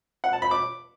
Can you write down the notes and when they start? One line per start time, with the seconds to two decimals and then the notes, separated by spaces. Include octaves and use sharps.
0.24 F#5
0.33 A5
0.42 B5
0.51 D6